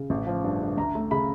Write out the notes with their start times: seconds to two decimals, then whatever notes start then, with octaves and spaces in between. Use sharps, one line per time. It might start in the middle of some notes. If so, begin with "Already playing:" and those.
Already playing: C#3
0.10 A1
0.27 F3
0.44 G2
0.61 D3
0.77 D2 A#5
0.95 A3
1.11 C#3 B5